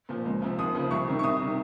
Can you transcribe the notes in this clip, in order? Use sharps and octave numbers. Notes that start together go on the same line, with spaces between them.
A#2 F3
C#2
C3 F3
D#2 D#6
C#3 F3
C2 C#6
C3 D#3
C#6
C2 D#6
C3 D#3